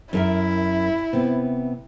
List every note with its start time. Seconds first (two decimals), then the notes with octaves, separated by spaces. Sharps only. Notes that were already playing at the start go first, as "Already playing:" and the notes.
0.13 F#2 E4 A#4 E5
1.13 C3 B3